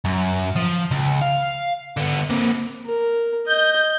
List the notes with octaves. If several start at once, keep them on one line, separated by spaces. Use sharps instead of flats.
F#2
F3
C#2
F5
D3 B3
A#3 C4
A#4
D#5 G6